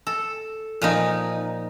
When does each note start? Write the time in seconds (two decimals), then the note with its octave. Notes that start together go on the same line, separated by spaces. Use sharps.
0.07 A4
0.82 A#2 F3 D#4